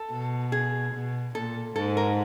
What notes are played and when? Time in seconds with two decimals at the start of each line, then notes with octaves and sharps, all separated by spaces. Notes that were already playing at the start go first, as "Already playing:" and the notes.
Already playing: A4
0.11 B2
0.52 G#4
0.94 B2
1.35 A#2 A4
1.76 G#2 A4
1.97 A#4